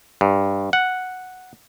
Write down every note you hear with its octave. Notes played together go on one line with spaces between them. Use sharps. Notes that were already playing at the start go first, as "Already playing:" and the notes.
G2
F#5